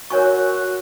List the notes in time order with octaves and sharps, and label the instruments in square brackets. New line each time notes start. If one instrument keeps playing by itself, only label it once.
[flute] F#4 [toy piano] A#4 C#5 G#5 C#6